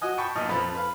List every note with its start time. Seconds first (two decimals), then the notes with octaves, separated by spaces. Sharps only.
0.01 F#4 D#5 G#5
0.18 G5 A5 B5 C#6
0.35 B1 A#2 D#5 A5 A#5 F6
0.49 F2 B4 A5 B5
0.75 B4 F5